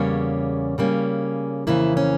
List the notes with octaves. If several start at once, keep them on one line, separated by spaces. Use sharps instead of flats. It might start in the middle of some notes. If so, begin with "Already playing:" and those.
Already playing: E2 C#3 G3 A#3 C#4 C#5
C#3 G3 A#3 C#4
F2 C#3 E3 A#3 E4
C#4